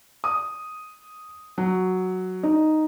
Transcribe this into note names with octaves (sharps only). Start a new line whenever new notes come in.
D#6
F#3
D#4